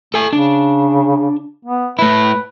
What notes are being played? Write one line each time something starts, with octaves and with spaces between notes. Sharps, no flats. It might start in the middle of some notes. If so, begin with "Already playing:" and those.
A3 A4 G#5
C#3 D4
B3
A3 E4 B4